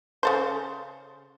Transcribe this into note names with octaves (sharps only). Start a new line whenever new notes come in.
C#3 A4 C5